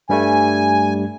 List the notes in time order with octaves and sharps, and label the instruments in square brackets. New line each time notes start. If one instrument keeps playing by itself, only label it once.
[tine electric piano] G2 G3 A3 [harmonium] G#5